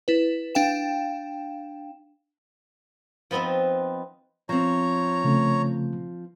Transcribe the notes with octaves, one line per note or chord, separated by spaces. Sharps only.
E4 B4
D4 F5 G5 E7
F3 B3 C4 D#4 B4
F3 C4 C#5 A#5
C#3 A3